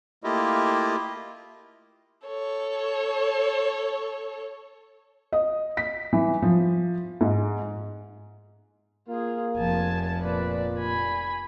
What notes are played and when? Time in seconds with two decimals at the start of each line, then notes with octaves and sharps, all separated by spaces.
0.24 A3 A#3 E4 F4 G4 D#5
2.27 A4 C#5
5.32 D#5
5.77 B6
6.13 E3
6.42 F3
7.21 G#2
9.08 A#3 F4 G#4
9.57 F1 F3 G#5 A5
10.22 A#2 B4 D5
10.79 G#5 B5